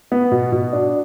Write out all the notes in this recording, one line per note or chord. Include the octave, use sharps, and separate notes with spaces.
B3
B2
B2
D4